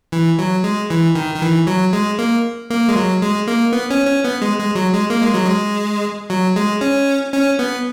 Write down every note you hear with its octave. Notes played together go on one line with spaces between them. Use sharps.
E3
F#3
G#3
E3
D#3
D#3
E3
F#3
G#3
A#3
A#3
G#3
F#3
G#3
A#3
B3
C#4
C#4
B3
G#3
G#3
F#3
G#3
A#3
G#3
F#3
G#3
F#3
G#3
C#4
C#4
B3